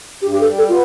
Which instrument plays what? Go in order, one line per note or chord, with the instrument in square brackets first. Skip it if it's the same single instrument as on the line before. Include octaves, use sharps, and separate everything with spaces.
[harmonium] G2 [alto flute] G4
[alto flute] G4
A4
[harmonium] G3
[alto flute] A4
[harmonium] B3 [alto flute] F4